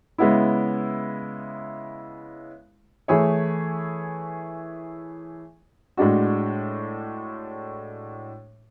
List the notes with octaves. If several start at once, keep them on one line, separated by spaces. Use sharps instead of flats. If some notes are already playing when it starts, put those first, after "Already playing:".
C#3 G#3 B3 E4
E3 A3 E4 G#4 C#5
A2 G#3 D4 F#4